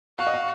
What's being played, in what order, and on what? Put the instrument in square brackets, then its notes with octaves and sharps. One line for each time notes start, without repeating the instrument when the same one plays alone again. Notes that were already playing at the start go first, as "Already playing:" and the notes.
[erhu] F#4 [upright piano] F5
[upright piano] D#5
F5